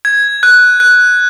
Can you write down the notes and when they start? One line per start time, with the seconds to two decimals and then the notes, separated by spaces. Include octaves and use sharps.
0.05 G#6
0.43 F#6
0.80 F#6